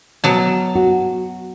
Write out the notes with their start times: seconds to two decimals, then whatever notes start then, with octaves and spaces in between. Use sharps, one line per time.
0.24 B2 F#3 A5
0.75 F#4